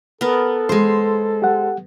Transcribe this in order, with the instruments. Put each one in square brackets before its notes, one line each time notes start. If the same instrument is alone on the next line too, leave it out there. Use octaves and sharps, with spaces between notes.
[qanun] B3 A#4 [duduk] A4
[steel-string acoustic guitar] G#3 C5
[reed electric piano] G4 F#5